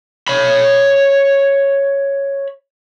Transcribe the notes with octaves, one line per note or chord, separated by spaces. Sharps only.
C#5 B5